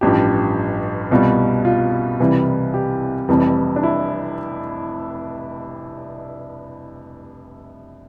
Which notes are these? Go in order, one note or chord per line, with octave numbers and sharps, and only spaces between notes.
A1 G2 F3 G4
C2 B2 G3 F4
F4
C2 C3 E3 G3
G4
F1 F2 E3 G3
D4
E4